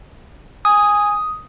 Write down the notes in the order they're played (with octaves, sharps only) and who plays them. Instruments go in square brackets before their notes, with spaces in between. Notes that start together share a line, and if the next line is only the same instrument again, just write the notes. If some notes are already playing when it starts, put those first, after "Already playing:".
[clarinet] G#5 [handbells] D#6